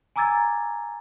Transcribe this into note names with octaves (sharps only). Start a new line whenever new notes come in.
G#5 A#5 D6 E6 G#6 A6